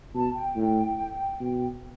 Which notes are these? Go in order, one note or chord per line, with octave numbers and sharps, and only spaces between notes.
B2 A5
G5
A2
B2